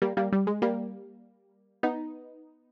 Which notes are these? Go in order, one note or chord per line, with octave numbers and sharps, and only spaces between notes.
G3 A#3
G3 A#3
G3
G#3
G3 A#3
B3 D#4